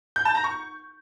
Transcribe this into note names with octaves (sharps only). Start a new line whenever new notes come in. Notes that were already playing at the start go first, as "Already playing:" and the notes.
G6
A5
A#5
C#6